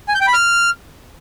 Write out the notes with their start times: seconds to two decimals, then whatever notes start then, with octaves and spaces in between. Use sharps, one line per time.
0.08 G#5
0.15 G6
0.21 G5
0.27 B5
0.33 F6